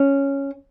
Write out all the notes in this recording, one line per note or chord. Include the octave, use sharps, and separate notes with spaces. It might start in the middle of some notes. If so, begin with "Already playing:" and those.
Already playing: C#4